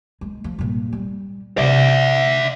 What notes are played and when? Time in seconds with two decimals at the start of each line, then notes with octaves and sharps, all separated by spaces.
0.21 G#3
0.44 F3
0.59 G2 A#2
0.93 G3
1.58 C3 D4 D5 E5